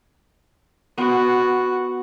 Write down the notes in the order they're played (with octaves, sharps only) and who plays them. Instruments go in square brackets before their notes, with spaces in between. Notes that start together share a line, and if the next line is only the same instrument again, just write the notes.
[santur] B3 [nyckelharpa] F#4